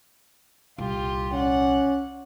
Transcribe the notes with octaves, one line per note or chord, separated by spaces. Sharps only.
D#1 C2 F4 G4
C#4 D5 F#5